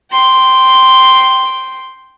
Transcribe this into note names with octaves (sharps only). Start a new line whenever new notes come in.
G5 C6